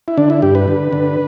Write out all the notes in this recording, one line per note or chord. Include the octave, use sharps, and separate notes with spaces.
E4
D3 D4
E4
G2 G4
B4
D3
D3